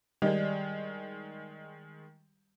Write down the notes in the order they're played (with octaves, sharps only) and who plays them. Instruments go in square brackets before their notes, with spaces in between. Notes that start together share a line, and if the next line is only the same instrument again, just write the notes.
[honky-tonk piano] D#3 G#3 [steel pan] G3 [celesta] D5 D#5